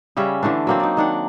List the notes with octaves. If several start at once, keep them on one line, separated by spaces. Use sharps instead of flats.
C#3 G3 C#4 E5
D3 E3 A3 D4
F#3 A#3 C4
D#4 D5
D#3 D4 F#5